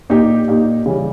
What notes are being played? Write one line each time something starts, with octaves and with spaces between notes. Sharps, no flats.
A#2 A#3 D#4 G4
A#2 A#3 D#4 G4
C#3 E3 G3